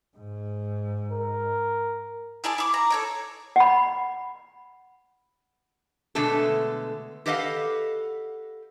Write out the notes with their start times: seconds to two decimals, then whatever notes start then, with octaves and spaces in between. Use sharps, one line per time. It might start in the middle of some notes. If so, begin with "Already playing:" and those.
0.17 G#2
1.12 A#4
2.44 E4 G#4 D5 A5
2.58 E4 D6
2.74 A#5
2.90 A4 C#5 D5
3.56 F#5 B5
6.15 B2 D3 G#3 A3 B3 A4
7.26 G4 A4 B4 D#5 F5 F#5